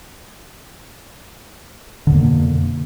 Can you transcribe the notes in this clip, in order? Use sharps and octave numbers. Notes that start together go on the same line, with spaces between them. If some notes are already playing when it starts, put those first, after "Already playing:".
F2 B2 D3 A#3